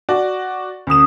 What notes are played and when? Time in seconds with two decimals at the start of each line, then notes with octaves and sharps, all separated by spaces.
0.09 F#4 D5
0.87 D2 C#4 D#6 E7